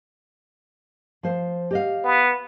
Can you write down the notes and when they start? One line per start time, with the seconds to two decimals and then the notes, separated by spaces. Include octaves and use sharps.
1.23 F3 C5
1.71 G4 D#5 F5
2.04 B3